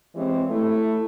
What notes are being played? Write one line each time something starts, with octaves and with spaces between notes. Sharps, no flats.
E3 G#3 C4 G4 C#5
A3 E4